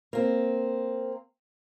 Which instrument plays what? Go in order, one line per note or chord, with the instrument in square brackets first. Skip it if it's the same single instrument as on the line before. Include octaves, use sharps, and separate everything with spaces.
[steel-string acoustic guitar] A#3 C4